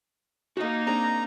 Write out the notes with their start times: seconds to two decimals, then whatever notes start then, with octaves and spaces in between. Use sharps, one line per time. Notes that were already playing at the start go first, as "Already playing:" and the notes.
0.57 A#3 D#4 F#4 D#5
0.87 C4 D4 G#4 A#5